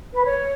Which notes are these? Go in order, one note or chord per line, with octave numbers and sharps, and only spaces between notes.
B4
C#5